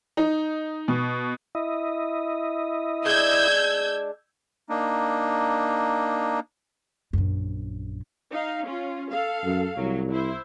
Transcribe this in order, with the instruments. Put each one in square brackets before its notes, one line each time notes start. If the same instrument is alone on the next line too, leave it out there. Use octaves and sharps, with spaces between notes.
[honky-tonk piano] D#4
B2
[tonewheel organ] E4 D#5
[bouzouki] G#3 D4 [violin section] E6 G6 G#6
[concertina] A#3 D4 D#4
[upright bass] A#1 F#2
[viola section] D#4 F5
C#4 F4
A4 F5
[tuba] F#2
[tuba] C2 [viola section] F#3
[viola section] E4 C5